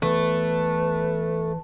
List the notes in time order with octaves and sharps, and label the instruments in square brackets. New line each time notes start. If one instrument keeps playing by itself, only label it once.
[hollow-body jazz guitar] E2 [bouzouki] A3 [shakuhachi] B4